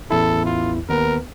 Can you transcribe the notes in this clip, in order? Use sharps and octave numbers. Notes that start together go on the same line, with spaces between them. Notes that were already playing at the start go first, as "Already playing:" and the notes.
A1 E2 E4 A4
F4
D#2 B3 A#4 B4